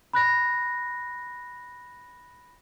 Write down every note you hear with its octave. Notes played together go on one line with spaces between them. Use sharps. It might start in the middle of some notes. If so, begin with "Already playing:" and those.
B5 F#6 A#6